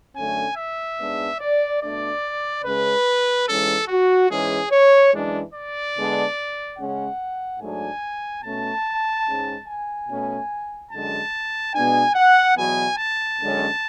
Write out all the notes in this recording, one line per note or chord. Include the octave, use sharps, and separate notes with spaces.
F#2 D3 A3 C#4 G#5
E5
G#2 G#3 B3 D4
D5
B2 A3 D4 D5
C#3 G#3 C#4 B4
G#2 E3 G#3 C#4 A4
F#4
G#2 E3 G#3 C#4 G#4
C#5
F#2 E3 G#3 D4
D5
D3 G#3 B3 D4
C#3 G#3 C#4 F#5
G#2 F#3 A3 D4 G#5
B2 A3 C#4 A5
G#2 G#3 C#4
G#5
B2 A3 C#4
F#2 D3 G#3 A5
B2 G#3 B3 D4 G#5
F#5
E2 B2 F#3 B3 G#5
A5
F#2 D3 G#3 C#4